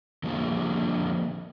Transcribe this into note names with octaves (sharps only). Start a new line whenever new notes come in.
D3 F3 G3 A#3